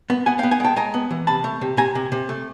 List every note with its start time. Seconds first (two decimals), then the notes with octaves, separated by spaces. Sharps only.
0.10 B3
0.26 B3 F#5 G#5
0.39 B3 F5 G5
0.51 F#5 G#5
0.60 G#3 G5 A5
0.76 G#3 G#5 A#5
0.94 B3
1.11 E3
1.27 C3 A5 B5
1.44 A3
1.61 C3
1.77 C3 G#5 A#5
1.95 C3
2.12 C3
2.29 A3